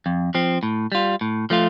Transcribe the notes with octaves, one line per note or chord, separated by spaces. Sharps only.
F2
F3 C4
A2
G3 F4
A2
F3 A3 F4